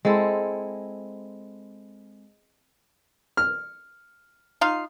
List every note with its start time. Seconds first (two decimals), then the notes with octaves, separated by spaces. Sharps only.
0.05 G#3 C4 E4 A4
3.37 F6
4.61 D#4 F4 F5